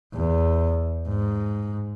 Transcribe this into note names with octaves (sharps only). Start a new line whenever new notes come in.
E2
G#2